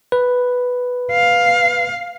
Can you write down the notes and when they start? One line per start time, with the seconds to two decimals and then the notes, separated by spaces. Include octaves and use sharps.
0.12 B4
1.12 F5